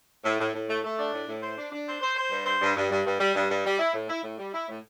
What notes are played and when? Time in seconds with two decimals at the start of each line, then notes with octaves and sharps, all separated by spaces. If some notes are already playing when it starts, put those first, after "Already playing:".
0.25 A2
0.40 A2
0.54 A2
0.69 A3
0.84 A3
0.99 D4
1.13 A2
1.28 A2
1.43 C5
1.58 D4
1.72 D4
1.88 C5
2.02 C5
2.17 C5
2.31 G2
2.46 C5
2.62 G2
2.76 G2
2.91 G2
3.05 G2
3.20 G3
3.35 G2
3.50 G2
3.65 G3
3.79 E4
3.94 A2
4.09 E4
4.23 A2
4.39 G3
4.53 E4
4.69 A2